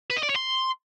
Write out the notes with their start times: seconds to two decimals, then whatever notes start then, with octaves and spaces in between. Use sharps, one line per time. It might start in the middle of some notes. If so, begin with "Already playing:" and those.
0.10 B4
0.16 D#5
0.23 D5
0.29 C#5
0.36 C6